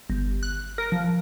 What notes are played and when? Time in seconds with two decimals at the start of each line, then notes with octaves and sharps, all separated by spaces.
0.10 G1
0.43 F#6
0.78 A#4
0.92 F3